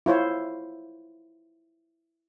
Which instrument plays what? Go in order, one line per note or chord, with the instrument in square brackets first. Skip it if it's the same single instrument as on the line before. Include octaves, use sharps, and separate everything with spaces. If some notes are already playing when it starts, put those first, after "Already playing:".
[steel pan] E4 F4 C5 C#5